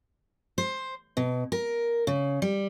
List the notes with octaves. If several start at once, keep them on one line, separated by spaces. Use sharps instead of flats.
C5
B2
A#4
C#3
G3